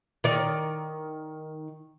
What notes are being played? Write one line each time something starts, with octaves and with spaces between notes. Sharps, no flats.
D#3 D5